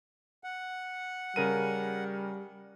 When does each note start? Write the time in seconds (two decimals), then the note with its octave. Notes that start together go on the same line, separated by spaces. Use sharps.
0.44 F#5
1.36 C#3 G3 A#4 D#7